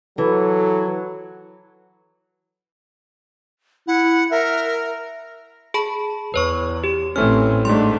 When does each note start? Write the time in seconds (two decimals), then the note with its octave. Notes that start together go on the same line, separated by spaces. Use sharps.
0.18 E3 F#3 A4
3.88 E4 F#5
4.31 A#4 E5
5.74 G#4 A5 B5
6.34 E2 B4 C#5 C#6
6.84 G4
7.16 A1 E3 A3 C4 C#4 F6
7.65 G#2 G3 A3 D4 C6